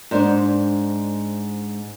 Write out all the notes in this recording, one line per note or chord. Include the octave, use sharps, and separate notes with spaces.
G#2 D4 C5